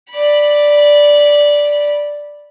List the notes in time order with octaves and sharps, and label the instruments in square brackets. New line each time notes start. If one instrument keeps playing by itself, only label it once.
[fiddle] D5 B5